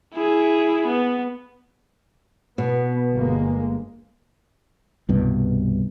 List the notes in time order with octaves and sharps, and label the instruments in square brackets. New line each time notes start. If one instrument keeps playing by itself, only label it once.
[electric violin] E4 G#4
B3
[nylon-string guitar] B2 [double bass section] B3
[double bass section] G1 G#3 A#3
[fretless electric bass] C2 G2 B2